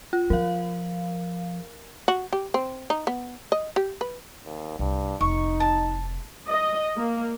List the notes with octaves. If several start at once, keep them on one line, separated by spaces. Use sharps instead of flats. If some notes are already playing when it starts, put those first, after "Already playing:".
F4
F3 A#4 F5
F#4
G4
C4
D#4
B3
D#5
G4
B4
D#2
C2 G2
F1 D#4 C#6
A5
D#5
A#3